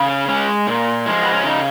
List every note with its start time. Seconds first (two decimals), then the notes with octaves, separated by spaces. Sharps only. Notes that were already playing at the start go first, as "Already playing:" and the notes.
Already playing: C#3
0.08 C#4
0.28 G#3 C#4
0.67 A#2
1.06 F3 G#3
1.23 B3
1.33 C#4
1.44 C#3 D#4